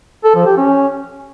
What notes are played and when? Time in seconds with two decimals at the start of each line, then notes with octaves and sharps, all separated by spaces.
0.24 A4
0.35 F3
0.46 G4
0.57 C#4